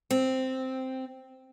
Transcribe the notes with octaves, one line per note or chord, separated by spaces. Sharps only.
C4